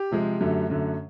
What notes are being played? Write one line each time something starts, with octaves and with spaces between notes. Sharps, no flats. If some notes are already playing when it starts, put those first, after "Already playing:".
Already playing: G4
C3 F3 G#3
F#2 D3 F#3 A3
F#2 D3 F#3 A3